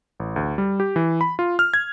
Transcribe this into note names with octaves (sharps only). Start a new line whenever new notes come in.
A1
D2
G3
G4
E3
B5
F4
F6
G#6